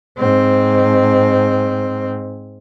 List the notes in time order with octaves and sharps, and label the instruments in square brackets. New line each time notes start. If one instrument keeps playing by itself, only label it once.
[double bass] G#2 C4